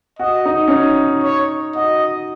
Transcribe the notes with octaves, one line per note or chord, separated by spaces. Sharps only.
F#4 D#5
D#4
C#4
D#4
C#5
F#4 D#5